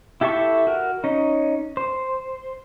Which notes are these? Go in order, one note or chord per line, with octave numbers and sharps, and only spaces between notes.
E4 G4 A4 E5 C#6
F#4 A#4
C#4 D#4
C5